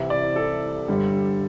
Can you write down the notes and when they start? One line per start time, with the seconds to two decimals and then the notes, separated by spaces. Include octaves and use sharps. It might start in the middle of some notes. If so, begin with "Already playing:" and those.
Already playing: C2 C3 E3 G3 E5
0.10 D5
0.36 A4
0.88 G1 G2 D3 G3